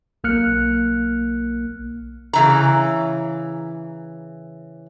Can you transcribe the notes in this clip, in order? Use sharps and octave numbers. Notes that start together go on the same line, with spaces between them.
B1 A#3 F6 F#6 C#7
C#3 E3 A#5